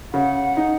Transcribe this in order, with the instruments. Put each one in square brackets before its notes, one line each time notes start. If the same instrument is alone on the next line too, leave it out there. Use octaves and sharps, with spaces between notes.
[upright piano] C#3 [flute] F#5
[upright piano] D#4